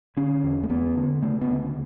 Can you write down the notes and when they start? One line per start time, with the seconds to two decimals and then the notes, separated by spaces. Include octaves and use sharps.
0.17 D3 C#4
0.43 E2
0.63 A3
0.69 E2 B3
0.96 D3
1.23 C#3 A3
1.41 B3
1.49 D2